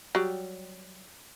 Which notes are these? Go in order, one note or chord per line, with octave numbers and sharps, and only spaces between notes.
F#3 G3